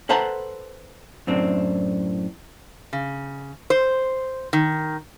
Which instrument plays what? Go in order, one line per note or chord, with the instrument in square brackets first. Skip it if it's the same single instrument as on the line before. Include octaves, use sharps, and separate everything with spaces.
[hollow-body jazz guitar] A4 B4 C5 F#5 A5 A#5
F#2 A2 C4 D4
[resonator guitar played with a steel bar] C#3
C5
D#3